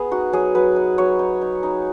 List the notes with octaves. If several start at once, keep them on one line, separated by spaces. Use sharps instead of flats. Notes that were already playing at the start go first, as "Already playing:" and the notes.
Already playing: B3 G#4
D#4 F#4
F#3 G#4
F#3 B4
D#4
F#3 C#5
D#4
D#4
D#4